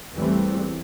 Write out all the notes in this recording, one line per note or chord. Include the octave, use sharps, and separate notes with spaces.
A1 E2 E3 G3 A3 C4